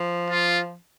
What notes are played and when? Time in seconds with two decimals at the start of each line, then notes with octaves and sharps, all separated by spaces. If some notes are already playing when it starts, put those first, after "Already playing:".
Already playing: F3
0.30 F4